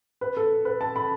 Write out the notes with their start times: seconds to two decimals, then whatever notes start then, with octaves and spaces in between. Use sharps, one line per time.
0.21 B4
0.37 A4
0.65 B4
0.81 A5
0.96 B5